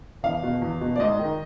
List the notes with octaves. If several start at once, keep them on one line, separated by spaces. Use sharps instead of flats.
E2 F5
B2
E2
B2
D5
G#2 D#5
D#3